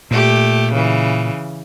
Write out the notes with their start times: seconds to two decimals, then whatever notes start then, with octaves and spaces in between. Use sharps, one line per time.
0.11 A#2 A3 G4
0.72 C#3 E3